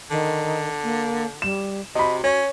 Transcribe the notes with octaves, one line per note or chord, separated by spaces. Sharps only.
D3 D#3
A#3
G3 E7
C3 F#4 D#5 B5
C#4 C#5